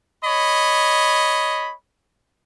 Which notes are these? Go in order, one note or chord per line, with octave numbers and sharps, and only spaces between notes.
C#5 D#5 B5